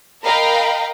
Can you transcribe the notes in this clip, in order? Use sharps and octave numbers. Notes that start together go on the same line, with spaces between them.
A#4 D#5 F5 G5 A#5 B5